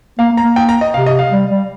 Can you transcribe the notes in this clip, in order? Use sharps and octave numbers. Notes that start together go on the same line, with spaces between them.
A#3 F5
A#3
A#5
A#3
G5
A#5
D#5
C3 F5
D#5
F5
G3
G3